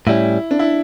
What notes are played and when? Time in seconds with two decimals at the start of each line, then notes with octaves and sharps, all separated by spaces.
0.07 A2 G3 C#4 E4
0.51 D4
0.59 E4